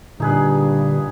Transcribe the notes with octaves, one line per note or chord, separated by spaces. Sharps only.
G2 A#2 D3 D#4 G#4 B4